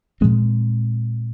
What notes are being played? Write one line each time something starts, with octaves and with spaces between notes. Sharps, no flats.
A#2 F3 G#3 C4